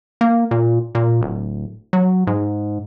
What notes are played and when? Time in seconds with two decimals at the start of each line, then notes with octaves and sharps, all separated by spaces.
0.21 A#3
0.51 A#2
0.95 A#2
1.21 D1
1.93 F#3
2.27 G#2